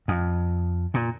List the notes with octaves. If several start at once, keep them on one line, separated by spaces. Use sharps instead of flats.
F2
A#2